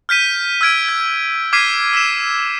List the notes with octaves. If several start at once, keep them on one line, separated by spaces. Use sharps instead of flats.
F6 G6 B6 D#7
E6 F6 G#6 D7
G#6
D6 F6 G#6 B6 C7 D#7
E6 B6 E7